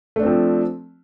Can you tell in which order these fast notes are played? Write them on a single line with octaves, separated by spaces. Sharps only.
A3 D4 C4 F3